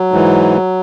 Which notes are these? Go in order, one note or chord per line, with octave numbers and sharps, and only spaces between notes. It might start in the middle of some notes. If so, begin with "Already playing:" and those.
Already playing: F#3
G#2 E3